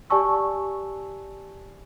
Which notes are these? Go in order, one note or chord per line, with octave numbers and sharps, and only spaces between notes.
G4 D5 G#5 A5 C#6 E6